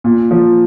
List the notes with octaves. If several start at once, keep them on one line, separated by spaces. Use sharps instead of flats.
A#2
F3